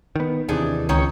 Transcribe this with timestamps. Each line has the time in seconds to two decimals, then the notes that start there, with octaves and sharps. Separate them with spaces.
0.16 D#3 B3
0.49 D#2 C3 E3 D4 D#4 G#4
0.89 C#2 D#3 C#4 C#5